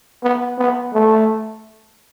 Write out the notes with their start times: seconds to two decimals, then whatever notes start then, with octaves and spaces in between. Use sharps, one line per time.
0.23 B3
0.59 B3
0.94 A3